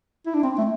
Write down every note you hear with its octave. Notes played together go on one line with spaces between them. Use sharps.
E4
D4
C4
A3